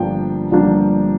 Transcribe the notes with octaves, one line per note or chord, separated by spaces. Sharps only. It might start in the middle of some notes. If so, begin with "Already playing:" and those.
Already playing: G1 G2 F3 A#3 D4 G5
G1 G2 F3 A#3 D4